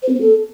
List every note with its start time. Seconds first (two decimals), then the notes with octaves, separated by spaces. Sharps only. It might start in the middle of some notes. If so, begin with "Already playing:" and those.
0.02 C5
0.09 C4
0.15 B3
0.21 A4